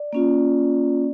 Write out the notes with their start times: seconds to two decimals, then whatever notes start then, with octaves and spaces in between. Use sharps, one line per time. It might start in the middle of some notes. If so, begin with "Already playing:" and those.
Already playing: D5
0.13 A#3 C#4 F4